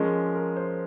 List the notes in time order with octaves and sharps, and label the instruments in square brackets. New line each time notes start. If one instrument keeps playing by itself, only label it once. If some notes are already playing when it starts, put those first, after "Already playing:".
Already playing: [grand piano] F3 G#3 C#4 [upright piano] A#4
[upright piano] A#4
C5